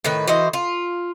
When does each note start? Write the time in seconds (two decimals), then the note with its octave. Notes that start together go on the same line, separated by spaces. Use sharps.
0.04 A2 D#3 B4
0.28 E3 F#4 C5 D#5
0.53 F4